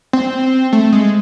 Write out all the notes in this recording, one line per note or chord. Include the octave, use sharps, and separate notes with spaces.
C4
A3
G#3